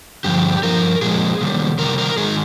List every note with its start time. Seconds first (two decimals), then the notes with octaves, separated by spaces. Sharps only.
0.24 G2 D3 F3 G4
0.63 G2 F3 A#4
1.02 A#2 F3 G#3 G#4
1.41 C3 D#3 G3
1.78 C3 D#3 G3 A#4
1.98 A#4
2.18 D#3 G#3 G#4